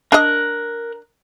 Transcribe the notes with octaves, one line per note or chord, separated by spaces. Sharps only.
D4 A#4 D#5 F#6